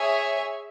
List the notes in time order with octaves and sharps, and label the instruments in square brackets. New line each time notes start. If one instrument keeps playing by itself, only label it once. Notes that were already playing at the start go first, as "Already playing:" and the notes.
Already playing: [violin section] G#4 C#5 E5 G#5